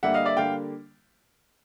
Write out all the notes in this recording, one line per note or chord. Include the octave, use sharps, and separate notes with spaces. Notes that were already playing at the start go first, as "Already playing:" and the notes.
D3 G3 A#3 E5 F#5
D#5 F5
D5 E5
D3 G3 A#3 F5 G5